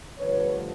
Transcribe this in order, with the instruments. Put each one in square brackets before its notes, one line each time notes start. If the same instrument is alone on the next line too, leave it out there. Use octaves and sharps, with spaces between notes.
[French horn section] G2 D3 F3 A3 B4 C#5